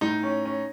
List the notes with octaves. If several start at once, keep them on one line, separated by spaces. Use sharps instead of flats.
A2 D#4
C#4
C#4